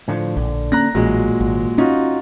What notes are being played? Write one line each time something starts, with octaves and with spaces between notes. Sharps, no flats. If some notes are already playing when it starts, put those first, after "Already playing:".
A2 D3 F3
A#1 D3
A#3 C#4 A#5 F#6 A#6
A1 A#2 F#3 G#3
G#1
C#4 D#4 F4 F#4